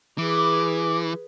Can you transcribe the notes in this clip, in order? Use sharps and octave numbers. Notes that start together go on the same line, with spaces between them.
E3 G#4 B4 D6